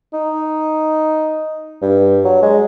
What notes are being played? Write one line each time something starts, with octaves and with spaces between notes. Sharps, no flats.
D#4
G2
F#3
G#3